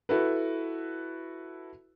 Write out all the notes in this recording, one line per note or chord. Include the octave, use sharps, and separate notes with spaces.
E4 F#4 A4 B4